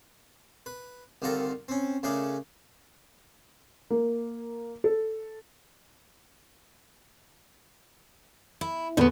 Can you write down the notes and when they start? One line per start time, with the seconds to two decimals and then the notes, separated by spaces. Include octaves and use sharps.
0.66 B4
1.22 C2 D3 D#3 F4 A4 A#5
1.68 C4 C#4
2.03 C#3 A3 D4 G#4 A#4
3.90 A#3
4.84 A4
8.61 E4
8.97 E2 A2 D3 B3 D#4